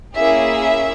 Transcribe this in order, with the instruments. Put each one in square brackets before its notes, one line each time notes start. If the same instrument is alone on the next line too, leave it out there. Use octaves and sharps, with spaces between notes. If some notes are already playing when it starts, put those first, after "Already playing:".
[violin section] A#3 C#4 E4 G#4 E5